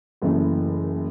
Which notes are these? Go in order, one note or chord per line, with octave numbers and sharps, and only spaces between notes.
F#1 F#2 E3 A3